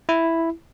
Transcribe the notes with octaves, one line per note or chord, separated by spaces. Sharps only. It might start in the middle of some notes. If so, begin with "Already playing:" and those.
E4